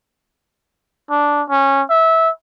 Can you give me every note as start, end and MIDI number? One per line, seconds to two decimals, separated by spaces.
1.10 1.42 62
1.50 1.82 61
1.90 2.30 76